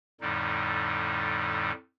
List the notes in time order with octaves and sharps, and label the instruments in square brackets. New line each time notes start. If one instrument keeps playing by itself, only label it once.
[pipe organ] F2 A2 D3 G3 D#4